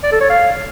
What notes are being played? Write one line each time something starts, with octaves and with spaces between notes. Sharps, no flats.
D5
A4
C#5
F5